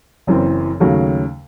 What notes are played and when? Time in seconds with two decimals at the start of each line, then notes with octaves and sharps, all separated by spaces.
0.27 F#1 F#2 E3 C4
0.80 D#2 C#3 F#3 A3